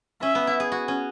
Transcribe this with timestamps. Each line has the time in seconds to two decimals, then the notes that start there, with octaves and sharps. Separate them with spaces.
0.22 C#4 E5
0.35 B3
0.47 E4
0.60 G#4
0.72 F#4
0.88 C#4